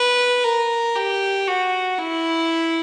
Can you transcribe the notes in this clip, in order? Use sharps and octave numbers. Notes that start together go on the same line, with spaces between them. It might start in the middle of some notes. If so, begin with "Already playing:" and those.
Already playing: B4
A#4
G4
F#4
E4